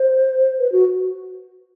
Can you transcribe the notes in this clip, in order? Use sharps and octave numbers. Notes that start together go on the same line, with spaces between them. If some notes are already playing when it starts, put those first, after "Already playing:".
Already playing: C5
B4
F#4